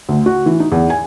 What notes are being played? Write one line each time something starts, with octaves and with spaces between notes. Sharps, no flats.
D2
F#4
E3
D#4
E2
G#5